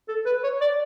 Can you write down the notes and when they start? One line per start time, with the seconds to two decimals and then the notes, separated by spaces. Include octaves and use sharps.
0.08 A4
0.26 B4
0.44 C#5
0.61 D5